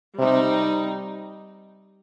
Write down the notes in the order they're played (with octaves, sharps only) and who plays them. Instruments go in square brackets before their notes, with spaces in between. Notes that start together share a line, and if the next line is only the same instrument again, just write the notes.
[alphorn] C3 [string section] G3 C4 D#4